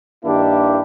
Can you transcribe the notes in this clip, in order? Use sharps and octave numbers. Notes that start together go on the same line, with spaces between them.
G2 D#3 A#3 D4 E4 G4